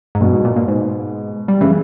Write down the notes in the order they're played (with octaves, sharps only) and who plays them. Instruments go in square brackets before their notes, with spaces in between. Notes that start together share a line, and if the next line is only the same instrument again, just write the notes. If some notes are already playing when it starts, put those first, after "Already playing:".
[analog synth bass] G#2
[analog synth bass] G2 [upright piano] B2
[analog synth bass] G#2
A#2
A#2
G#2
G3
[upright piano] C#3 [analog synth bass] E3